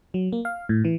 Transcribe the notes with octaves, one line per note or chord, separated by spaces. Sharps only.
F#3
A#3
F5
A2
E3